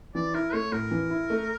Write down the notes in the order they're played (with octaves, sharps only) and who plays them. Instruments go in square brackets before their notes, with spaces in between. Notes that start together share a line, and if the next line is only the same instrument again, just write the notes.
[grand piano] E3 [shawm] D5
[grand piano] E4 [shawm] A#4
[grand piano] A3 [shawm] C#5
[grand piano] A2 [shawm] A#4
[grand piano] E3
E4
A3